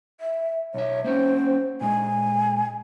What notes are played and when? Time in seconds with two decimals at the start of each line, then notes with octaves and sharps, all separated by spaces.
0.21 E5
0.74 B1 C#5 E5
1.04 A#3 C4 C#4 C5
1.81 A#2 G#3 G#5